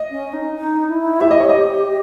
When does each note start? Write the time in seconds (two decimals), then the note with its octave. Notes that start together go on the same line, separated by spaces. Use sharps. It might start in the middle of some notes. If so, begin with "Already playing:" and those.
Already playing: D#5
0.11 C#4
0.33 D#4
0.55 D#4
0.89 E4
1.21 G4 E5
1.31 D#5
1.40 C#5
1.49 D#5